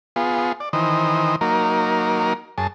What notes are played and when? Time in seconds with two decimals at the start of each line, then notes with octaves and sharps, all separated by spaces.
0.16 B3 F4 G#4
0.60 D5
0.73 D#3 E3 C5 D#5
1.41 F#3 A#3 D#4 A#4
2.58 F#2 G#4 A5